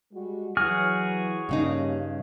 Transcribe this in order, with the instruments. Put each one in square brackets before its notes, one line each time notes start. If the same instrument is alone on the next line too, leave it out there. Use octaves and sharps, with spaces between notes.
[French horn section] G3 G#3 F#4
[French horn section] E3 F#3 [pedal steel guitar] F#4 G#4 F6
[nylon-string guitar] G2 C#3 D#4 [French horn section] G3 A#3 C#4